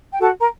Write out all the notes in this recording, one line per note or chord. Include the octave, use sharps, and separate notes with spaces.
G5
F#4 A4 A5
A#4 A#5